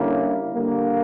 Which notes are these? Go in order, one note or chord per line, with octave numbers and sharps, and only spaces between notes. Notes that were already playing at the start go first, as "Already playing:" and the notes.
Already playing: D3 G3 A#3 C#4 E4
D3 G3 A#3